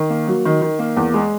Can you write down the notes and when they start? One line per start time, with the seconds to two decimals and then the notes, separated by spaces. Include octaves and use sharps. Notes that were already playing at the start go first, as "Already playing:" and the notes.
Already playing: D#3
0.10 A#3
0.27 F#3
0.45 D#3
0.62 D#3
0.79 A#3
0.97 E2
1.14 G#3